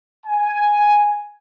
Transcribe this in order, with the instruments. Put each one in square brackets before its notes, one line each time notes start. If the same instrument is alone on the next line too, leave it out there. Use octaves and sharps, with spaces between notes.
[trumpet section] G#5